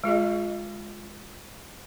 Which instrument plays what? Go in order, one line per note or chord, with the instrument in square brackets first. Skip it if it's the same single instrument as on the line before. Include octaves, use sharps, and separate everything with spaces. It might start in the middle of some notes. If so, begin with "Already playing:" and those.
[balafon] G#3 F4 G#4 D#5